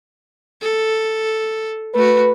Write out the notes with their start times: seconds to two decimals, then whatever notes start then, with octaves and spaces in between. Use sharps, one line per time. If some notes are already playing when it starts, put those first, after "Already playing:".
0.62 A4
1.95 A3 F#4 B4